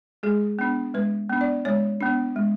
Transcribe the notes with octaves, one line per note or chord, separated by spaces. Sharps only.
G#3 G#4
B3 D4
G#3 B4
B3 D4
D5
G#3 C#5
B3 D4
G#3